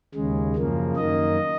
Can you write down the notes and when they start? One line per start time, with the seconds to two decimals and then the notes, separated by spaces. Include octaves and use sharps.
0.15 D#2 C#3 G#3
0.56 F#2 C#3 F3 A#3
0.96 F#2 D#3 A#3 D#5